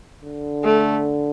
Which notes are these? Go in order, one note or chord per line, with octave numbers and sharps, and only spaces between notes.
D3
A3